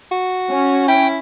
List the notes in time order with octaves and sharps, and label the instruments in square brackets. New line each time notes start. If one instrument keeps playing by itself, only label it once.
[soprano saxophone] F#4
[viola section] C#4
[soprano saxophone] E4 [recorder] G5